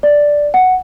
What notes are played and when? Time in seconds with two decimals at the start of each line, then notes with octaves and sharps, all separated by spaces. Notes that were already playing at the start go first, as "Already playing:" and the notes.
0.03 D5
0.54 F#5